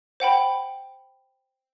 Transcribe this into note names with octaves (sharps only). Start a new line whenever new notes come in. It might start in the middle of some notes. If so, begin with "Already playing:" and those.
C5 F#5 G5 B5